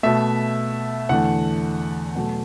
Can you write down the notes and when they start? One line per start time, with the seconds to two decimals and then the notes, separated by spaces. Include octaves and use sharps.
0.03 B2 A3 E5
1.09 E2 D3 A3 F#5
2.15 B2 F#3 A3